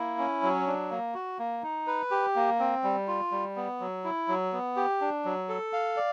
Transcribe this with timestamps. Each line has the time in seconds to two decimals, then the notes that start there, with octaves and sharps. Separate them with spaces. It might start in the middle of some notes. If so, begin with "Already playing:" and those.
Already playing: A#3 E4
0.18 C#4
0.43 F#3
0.67 D4
0.91 A#3
1.14 F#4
1.39 A#3
1.63 D#4
1.87 B4
2.11 G4
2.36 A#3
2.59 C4
2.84 G3
3.08 F4
3.31 G3
3.56 B3
3.80 F#3
4.04 E4
4.28 F#3
4.53 B3
4.76 G4
5.01 D4
5.25 F#3
5.49 A4
5.73 F5
5.97 D5